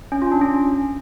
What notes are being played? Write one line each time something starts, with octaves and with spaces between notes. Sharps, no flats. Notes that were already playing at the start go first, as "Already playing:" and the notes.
C#4
F4
D4
C#4